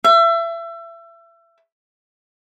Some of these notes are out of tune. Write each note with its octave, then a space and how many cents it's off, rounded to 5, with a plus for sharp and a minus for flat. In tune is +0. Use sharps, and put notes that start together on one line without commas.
E5 +30